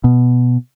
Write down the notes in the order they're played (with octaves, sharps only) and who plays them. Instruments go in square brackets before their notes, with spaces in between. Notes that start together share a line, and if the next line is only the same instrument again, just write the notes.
[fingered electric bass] B2